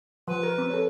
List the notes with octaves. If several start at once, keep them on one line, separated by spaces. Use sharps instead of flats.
F3 B4
A#4
C4
A4 C#5